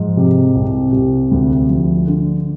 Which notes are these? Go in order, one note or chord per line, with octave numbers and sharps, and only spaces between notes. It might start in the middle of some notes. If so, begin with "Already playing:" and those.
Already playing: G#2 F3
C3
C2
C3
D2
F3
D3